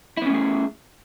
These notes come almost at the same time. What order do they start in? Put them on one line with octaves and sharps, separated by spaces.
E4 B3 C#4 A3 G#4